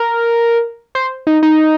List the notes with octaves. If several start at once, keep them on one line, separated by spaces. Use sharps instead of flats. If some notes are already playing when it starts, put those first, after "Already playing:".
Already playing: A#4
C5
D#4
D#4